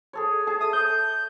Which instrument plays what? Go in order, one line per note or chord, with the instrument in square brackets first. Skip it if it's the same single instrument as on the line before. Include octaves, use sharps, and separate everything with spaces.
[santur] G#4 A4 C#5
G#4 A5
[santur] A4 E5 [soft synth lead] D#6
[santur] C#5 [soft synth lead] G6